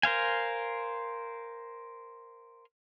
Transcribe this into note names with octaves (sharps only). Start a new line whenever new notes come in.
A#4 C5 F5 G#5